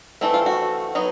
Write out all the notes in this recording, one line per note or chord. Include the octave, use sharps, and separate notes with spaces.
E3 A3 C4 E4
F4
F#4
F#3 B3 D#4